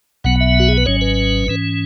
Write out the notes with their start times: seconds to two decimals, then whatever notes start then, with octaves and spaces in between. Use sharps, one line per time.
0.24 B1 B2 F#3 B3 F#5
0.40 E5
0.60 F#4
0.68 G#4
0.77 B4
0.86 G#1 G#2 F#3 C#4 C#5
1.01 B4
1.48 G#2 E3 C#4